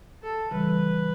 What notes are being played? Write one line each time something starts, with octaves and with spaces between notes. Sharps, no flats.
A4
C#3 E3 G3 B4